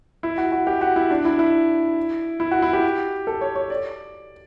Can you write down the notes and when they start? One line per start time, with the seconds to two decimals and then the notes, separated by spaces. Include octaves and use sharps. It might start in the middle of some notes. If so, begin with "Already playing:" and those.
0.23 E4
0.38 F#4
0.52 F#4
0.67 G4
0.81 F#4
0.96 E4
1.11 D4
1.25 E4
1.39 E4
2.40 E4
2.51 F#4
2.62 E4
2.73 G4
3.27 A4
3.41 C#5
3.56 C#5
3.70 D5